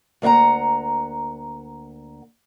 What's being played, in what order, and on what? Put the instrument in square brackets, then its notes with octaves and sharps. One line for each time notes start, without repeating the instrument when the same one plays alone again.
[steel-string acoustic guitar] D2 A#3 D#5 F#5 A#5